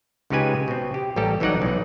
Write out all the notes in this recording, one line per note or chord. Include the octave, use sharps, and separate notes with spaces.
C#2 C#3 D#4 G4 B4 G#5
B2 C4
G4
A1 G3 A#3 G4 A4 A#5
C2 E3 F#3 D#4 D5 F#5
B1 E3